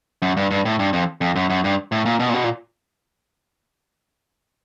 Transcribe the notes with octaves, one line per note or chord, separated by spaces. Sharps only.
F#2
G2
G2
A2
G2
F2
F2
F#2
F#2
G2
A2
A#2
B2
A#2
B2
A#2